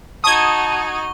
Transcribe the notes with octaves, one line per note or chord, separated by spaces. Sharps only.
D#4 F#4 A5 C#6 D#6 G#6 G7